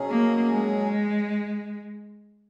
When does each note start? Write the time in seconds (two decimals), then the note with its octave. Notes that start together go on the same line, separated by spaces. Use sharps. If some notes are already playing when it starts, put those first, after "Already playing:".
Already playing: B2 F#3 C#4 G#4
0.09 A#3
0.53 G#3